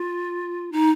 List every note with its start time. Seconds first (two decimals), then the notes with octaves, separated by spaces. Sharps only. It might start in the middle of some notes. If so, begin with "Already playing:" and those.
Already playing: F4
0.72 D#4